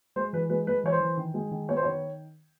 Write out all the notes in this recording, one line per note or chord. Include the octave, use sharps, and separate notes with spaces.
G#3 C5
E3 B4
G#3 B4
G#3 B4
E3 C#5
C5
E3
D#3
G#3
D#3
B3 C#5
C5
D#3 C#5